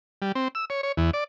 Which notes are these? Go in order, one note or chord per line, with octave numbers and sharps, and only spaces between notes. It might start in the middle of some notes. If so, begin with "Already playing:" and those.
G3
C4
E6
C#5
C#5
E2
D5